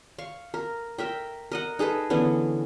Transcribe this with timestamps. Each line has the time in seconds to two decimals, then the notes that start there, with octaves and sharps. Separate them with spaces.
0.18 F5 C#6
0.54 A#4
0.98 A#4 E5 G5
1.52 A#4 D#5 F#5
1.79 D#4 G#4 A4 B4
2.10 D3 E3 B3 C#4